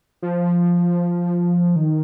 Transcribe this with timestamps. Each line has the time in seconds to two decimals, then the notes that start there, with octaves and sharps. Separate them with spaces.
0.22 F3
1.76 D#3